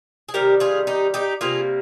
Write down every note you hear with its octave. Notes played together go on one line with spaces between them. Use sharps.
G#4
C3 D#3 G3 G4 A#4
F4 G#4
D#4 G4
D#4 G4
C3 G3 A#3 F4 G#4